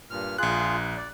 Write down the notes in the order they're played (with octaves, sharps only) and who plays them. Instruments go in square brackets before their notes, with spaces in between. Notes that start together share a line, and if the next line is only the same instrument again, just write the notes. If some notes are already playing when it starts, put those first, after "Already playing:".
[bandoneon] G2 A#2 F6
[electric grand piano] A#1 F#6 [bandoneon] F4 G#4
[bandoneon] D5